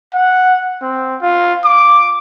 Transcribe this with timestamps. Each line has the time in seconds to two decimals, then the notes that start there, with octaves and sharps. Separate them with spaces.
0.14 F#5
0.82 C4
1.21 F4
1.64 D6